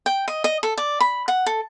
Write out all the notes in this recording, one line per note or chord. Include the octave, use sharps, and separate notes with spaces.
G5
D#5
D#5
A4
D5
B5
F#5
A4